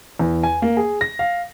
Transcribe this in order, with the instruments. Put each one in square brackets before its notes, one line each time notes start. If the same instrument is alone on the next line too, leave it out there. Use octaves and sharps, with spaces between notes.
[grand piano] E2
G#5
A#3
G#4
A#6
F5